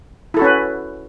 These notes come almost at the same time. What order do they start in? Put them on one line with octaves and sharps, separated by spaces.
E4 A4 F#4 C#4 B4